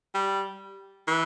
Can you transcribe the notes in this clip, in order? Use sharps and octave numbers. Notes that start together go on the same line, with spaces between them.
G3
E3